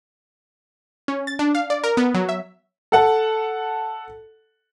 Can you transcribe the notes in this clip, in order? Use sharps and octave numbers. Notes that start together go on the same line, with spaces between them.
C#4
A6
D4
F5
D5
A#4
B3
F#3
E5
A4 F#5 A5